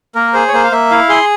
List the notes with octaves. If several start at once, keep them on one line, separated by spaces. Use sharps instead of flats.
A#3 A#4
G#4 C5
C#5
A#3 C5
F5
A#3 E5
E4 F5
G#4 C6